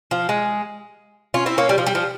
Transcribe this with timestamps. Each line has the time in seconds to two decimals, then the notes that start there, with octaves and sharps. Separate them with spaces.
0.11 F3
0.29 G#3
1.34 C#4 F4
1.46 C4 E4
1.58 A#3 C#4
1.69 G3
1.78 F3
1.86 G3
1.95 F3